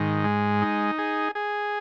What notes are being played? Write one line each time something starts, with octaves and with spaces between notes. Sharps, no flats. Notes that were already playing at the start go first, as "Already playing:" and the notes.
Already playing: G#2 D#3
G#3
D#4
G#4
G#4